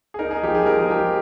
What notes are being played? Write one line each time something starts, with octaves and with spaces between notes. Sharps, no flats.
G#4
D#4 A#4
G#4
F3 G4
G#4
F3 A#4
G#4
F3 G4
G#4